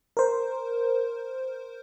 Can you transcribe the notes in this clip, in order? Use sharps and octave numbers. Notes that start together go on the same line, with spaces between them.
A#4 C5